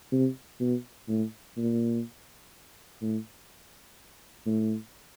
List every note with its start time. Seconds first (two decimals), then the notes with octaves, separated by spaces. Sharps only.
0.12 C3
0.60 B2
1.08 A2
1.57 A#2
3.02 A2
4.46 A2